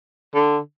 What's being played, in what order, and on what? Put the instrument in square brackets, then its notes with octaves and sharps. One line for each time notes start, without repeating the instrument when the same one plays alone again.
[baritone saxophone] D3